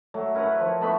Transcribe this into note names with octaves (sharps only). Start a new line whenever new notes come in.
F#3 A3
E4 A#4 B4 F#5
F3 C#5
A3 B3 B5 C#6